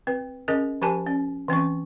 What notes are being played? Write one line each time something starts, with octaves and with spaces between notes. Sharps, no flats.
C4 B4
C#4 G#4 A#4 D#5
F3 G4 A#4 G#5 A5
C#4
E3 C4 C#4 C#6